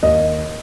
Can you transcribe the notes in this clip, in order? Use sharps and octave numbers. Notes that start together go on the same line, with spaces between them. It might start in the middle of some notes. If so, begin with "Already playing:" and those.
D#2 D#5